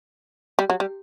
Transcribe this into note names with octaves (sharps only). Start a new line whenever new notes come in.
G3
F#3
G3